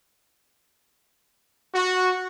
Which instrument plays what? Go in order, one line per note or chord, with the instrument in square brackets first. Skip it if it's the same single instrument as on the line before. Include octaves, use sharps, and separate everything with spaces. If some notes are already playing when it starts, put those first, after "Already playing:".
[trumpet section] F#4